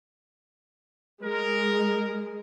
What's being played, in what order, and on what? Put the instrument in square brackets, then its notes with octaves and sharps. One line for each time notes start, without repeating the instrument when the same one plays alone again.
[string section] G#3 [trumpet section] A#4